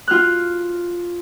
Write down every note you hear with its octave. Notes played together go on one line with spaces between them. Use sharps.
F4 F6 F#6